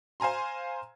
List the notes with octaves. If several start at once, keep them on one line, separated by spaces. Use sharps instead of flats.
C5 F5 G#5 A#5 C6